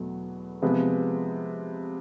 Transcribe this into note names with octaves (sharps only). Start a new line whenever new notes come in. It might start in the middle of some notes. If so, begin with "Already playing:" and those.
Already playing: E2 B2 F#3 A3
C3 F3 G#3 B3